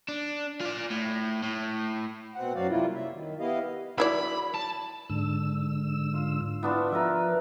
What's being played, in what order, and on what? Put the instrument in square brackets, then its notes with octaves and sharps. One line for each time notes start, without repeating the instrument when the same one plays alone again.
[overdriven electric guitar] D4
F4 D5
A2
A2
[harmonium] B2 C4 F#5
F#2 F#3 F#4 D5 F5
C3 G3 A#3 E4 F4
E5
D#3
B3 E4 G4 D#5 F5
[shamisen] F#3 E4 D5 [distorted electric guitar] B5
[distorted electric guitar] A5
[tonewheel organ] G#2 D3 E6
[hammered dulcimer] F4
[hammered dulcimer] B3 D4 F4 [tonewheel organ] E4
[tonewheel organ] F3 [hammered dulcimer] A#4 B4 E5